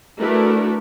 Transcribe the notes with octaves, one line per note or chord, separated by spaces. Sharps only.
A3 D4 E4 F#4 A#4 B4